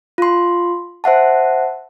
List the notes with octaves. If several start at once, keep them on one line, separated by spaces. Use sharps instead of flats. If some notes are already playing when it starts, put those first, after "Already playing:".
F4 C6
C5 E5 F#5 A5